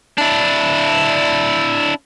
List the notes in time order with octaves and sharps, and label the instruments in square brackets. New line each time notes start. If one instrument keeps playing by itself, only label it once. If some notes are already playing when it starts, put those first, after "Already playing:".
[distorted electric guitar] D4 E4